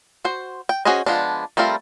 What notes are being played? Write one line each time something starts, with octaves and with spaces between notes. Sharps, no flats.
F#4 C5
G5
C#4 F#4 G#4 C5 D#5
F3 G#3 B3 D4
G3 A3 C4 F4 A#4